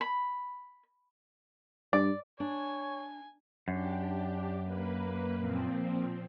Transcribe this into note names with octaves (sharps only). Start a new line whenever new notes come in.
B5
G2 D5
D4 C#5 G#5
F#2 D4 G4
A#3 B4
A#2 F3 C4